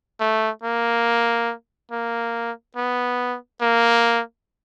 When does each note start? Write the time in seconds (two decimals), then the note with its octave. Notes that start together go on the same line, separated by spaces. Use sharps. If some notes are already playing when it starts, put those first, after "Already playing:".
0.20 A3
0.64 A#3
1.92 A#3
2.77 B3
3.61 A#3